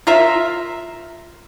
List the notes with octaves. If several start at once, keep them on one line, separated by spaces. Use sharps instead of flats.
F4 A#4 E5